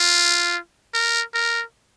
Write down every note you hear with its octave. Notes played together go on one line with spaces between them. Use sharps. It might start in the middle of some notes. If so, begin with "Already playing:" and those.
Already playing: F4
A#4
A#4